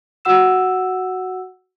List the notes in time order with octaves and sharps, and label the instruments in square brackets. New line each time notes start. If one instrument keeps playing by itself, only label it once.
[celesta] F#4 F#5 E6 E7